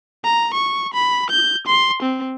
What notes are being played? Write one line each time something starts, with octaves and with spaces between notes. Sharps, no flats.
A#5
C#6
B5
G6
C6
C4